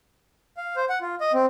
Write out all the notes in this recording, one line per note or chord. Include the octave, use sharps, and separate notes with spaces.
F5
C5
F#5
F4
D#5
C4